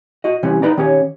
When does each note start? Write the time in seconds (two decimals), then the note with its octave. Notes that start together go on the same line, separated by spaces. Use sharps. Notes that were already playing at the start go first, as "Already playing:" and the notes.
0.24 F#4 D#5
0.43 C3 E3 G3 C#4
0.62 D#4 B4 D5 A#5
0.77 D#3 C#4 G4 C#5